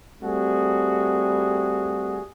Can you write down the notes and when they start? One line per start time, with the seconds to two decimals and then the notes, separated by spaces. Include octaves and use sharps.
0.23 G3 A3 C4 F#4 G#4